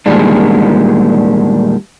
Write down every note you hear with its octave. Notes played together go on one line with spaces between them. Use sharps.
E2 A#2 D#3 G3 G#3 D4